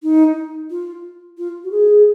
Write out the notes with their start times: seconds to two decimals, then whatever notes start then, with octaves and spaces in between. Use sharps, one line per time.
0.03 D#4
0.70 F4
1.38 F4
1.64 F#4
1.71 G#4